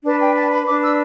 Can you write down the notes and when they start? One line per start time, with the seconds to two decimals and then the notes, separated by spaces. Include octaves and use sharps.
0.04 D4 B4 A5
0.21 G5
0.35 A5
0.51 B5
0.66 D4 B4 D6
0.82 E6